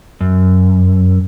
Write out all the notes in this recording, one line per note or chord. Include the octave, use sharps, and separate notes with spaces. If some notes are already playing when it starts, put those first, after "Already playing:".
F#2